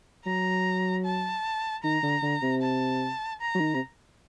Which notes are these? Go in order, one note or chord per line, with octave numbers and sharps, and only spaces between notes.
F#3 A#5
A5
D#3 A#5
D3
D3
C3
A5
A#5
F#3
D#3
C3